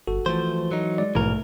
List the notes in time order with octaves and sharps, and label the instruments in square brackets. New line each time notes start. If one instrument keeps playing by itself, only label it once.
[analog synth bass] G1 [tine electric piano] F#4 A4
[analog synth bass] E3 [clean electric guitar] F3 A3 C5
[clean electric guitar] F#3 D#4
[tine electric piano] G#3 D5
[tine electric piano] A#1 G#2 B2 [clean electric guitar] E3 A#4 [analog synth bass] A3